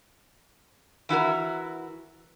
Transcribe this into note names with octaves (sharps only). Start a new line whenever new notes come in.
E3 E4 F#4 A#4